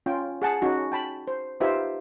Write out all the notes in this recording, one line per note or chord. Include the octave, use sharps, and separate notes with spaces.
C#4 F4 G5
G#4 F#5 A5
C#4 D#4 F#4
G5 A5 B5
C5
D#4 F4 G4 B4 C5 E5